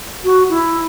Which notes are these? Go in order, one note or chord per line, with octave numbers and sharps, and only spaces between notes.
F#4
E4